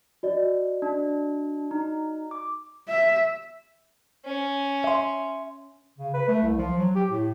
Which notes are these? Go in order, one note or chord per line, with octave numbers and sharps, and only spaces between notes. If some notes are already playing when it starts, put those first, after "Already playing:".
F#4 D5 D#5
D4
D#4
D6
E5
C#4
E5 C6
C#3
B4
A3
C2
F3
F#3
G4
A2